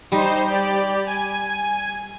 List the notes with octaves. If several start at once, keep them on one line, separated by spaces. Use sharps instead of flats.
G3 D#4 C5
G4 D5
G#5